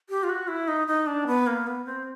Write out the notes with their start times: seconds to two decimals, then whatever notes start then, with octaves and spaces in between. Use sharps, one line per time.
0.09 G4
0.23 F4
0.29 F#4
0.48 E4
0.68 D#4
0.87 D#4
1.07 D4
1.27 B3
1.47 A#3
1.67 B3
1.86 C4